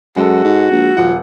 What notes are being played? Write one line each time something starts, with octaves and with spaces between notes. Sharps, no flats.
F#2 G#3 F#4 A4
G#2
A#1
D#1 F3 F#5